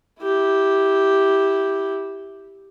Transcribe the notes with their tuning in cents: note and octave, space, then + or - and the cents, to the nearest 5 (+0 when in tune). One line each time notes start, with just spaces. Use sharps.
E4 -10 G4 +0